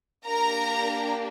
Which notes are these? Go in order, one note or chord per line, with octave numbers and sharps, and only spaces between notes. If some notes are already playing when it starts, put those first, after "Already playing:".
A#3 D4 G4 A#4 A#5